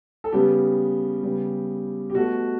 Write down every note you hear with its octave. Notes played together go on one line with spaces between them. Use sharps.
A4
C#3 G3 B3 G4
C#3 G3 B3
G4
B2 A3 F#4